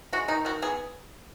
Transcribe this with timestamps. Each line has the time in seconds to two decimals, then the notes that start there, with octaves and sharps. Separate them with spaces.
0.13 G#3 F#4
0.28 D#3 D#4
0.45 D#3 F#4
0.62 B3 G#4